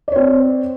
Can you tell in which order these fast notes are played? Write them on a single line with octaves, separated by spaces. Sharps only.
D5 C#5 C4